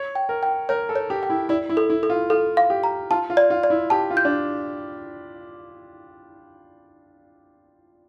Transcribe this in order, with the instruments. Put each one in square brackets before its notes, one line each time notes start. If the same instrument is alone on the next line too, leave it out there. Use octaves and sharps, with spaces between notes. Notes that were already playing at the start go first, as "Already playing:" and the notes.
Already playing: [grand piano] C#5
[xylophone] G5
[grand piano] A#4
[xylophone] G5
[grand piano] A#4 [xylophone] C#5
[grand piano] A4
[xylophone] C#5
[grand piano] G4
[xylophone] G5
[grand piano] E4
[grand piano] E4 [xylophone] D5
[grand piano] E4
[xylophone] A4
[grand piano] E4
[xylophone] A4
[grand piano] F4
[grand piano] F4 [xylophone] A4
[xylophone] F5
[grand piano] G4
[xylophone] A#5
[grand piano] F4 [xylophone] A5
[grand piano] F4
[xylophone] D5
[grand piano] F4
[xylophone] D5
[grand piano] E4
[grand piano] G4 [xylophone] A5
[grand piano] F4
[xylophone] G6
[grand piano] D4